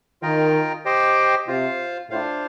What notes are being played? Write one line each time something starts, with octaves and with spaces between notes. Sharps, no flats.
D#3 F4 A#4 D#5 G5
G4 C5 D#5 G5
C3 F4 C5 F5
A2 D4 F4 C5 F5